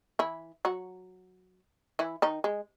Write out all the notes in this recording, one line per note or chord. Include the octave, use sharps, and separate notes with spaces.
E3 E4
F#3 F#4
E3 E4
D#3 D#4
G#3